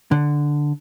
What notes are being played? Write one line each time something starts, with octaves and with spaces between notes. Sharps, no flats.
D3